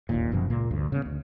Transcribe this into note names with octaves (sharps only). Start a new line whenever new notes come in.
E1 A1 D#2 A#2
F#1 F#2 B2 F3
C#2 A#2 A#3
D2 G2
C#3 B3
D2